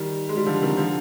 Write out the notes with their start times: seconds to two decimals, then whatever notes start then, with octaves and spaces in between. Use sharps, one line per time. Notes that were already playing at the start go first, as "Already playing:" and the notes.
Already playing: D#3 G3
0.29 G#3
0.37 G3
0.46 D3 F3
0.62 C3 D#3
0.77 D3 F3